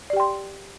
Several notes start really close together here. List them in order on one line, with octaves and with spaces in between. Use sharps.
D5 G4 G5 C6